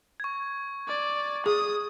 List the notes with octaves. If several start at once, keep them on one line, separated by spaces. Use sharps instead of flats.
C#6 G#6
D5
G#4 D#6